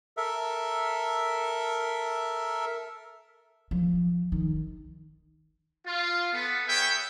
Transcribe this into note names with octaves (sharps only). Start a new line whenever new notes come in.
A4 A#4 E5
F3
D#3
F4
B3 A4
G#4 B4 C#5 E5 F#5 G5